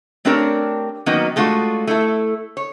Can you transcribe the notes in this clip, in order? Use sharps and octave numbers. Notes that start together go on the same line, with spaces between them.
A3 C4 D4 G4 A#4 C#5
D#3 F#3 A#3 B3 C#4 D#4
G#3 A3 D4 F4 F#4
A3 E4 A4
C#5